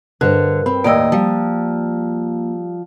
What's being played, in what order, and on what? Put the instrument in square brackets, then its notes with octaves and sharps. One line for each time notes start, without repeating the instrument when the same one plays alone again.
[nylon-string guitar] G2 A#4 [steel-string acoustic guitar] D3 [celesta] C5 D#5 F#6
[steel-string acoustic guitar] C4 [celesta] B5
[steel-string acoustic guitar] D#2 A2 D#5 [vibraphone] A#3 [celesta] D5 G5 E6
[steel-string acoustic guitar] F3 [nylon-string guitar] G3